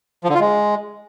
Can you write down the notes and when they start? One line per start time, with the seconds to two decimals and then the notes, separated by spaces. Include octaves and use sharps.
0.24 F3
0.29 D3
0.35 F4
0.40 G#3